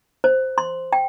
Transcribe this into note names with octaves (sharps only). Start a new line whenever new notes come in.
C5
C6
G5